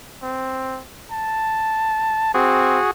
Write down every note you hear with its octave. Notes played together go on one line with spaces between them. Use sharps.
C4
A5
C4 F#4 G#4